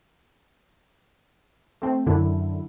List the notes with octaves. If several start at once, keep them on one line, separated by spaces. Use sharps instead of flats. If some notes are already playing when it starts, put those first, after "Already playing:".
A3 C4
F#2 D3 E4